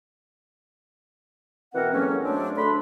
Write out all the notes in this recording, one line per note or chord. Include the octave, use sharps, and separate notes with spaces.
B2 E3 C4 A#4 F#5
E2 A2 F#3 A#3 C#4
G#2 F#3 A3 A#3 C4 D4
D2 D3 A3 D4 B5 C6